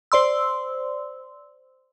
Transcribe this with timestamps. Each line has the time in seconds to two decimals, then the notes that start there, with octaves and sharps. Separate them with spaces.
0.12 C5 D5 C6 E6